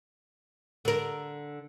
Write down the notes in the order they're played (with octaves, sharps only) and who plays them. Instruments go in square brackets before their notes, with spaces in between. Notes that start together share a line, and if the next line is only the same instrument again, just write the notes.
[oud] D3 A#4